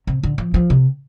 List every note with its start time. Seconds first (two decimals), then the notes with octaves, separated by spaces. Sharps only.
0.07 C3
0.23 D3
0.38 F3
0.54 F3
0.70 C3